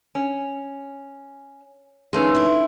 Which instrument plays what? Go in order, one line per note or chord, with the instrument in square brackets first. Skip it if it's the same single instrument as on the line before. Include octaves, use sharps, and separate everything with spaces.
[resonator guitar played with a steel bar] C#4
[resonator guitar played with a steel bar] F2 A3 C#4 [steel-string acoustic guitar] D#3 G#4 [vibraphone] D#4 B4 C6
[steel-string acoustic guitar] D4 E4